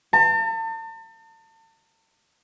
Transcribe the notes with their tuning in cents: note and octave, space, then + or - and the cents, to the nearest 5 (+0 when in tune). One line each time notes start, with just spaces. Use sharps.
A5 +40